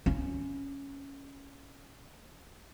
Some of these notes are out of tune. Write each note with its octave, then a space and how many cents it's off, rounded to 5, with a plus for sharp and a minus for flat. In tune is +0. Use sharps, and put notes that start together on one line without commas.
C#4 +0